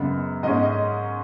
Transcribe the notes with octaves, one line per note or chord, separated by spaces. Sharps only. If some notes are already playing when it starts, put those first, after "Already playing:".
Already playing: F#2 C#3 G#3 B3
G#2 G#3 C#4 D#5
D#5